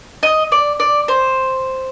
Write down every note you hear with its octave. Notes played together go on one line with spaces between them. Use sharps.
D#5
D5
D5
C5